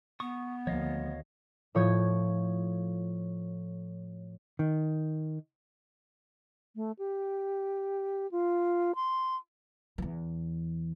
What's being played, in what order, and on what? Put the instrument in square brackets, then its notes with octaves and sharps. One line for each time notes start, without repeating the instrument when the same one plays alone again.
[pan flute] B3 [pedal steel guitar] C#6 D#6
[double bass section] D2 D#3 [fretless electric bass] F3 A#3 [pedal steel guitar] C#5 D#5 F5
[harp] A2 F3 C#5 D#6 G6 G#6
[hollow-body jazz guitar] D#3
[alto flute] A3
G4
F4
C6
[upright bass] E2 E3